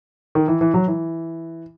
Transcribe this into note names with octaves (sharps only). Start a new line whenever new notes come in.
D#3
E3
E3
F#3
E3